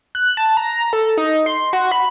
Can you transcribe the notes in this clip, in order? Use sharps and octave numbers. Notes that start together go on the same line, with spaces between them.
F#6
A5
A#5
A4
D#4
C6
F#4
B5